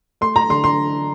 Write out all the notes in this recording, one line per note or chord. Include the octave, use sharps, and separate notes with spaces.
A3 C6
A#5
D3 C6
C6